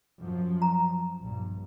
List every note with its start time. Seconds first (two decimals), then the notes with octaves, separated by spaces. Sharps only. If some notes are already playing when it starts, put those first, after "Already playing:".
0.19 F#2 F3
0.62 A#5
1.21 A#1 G2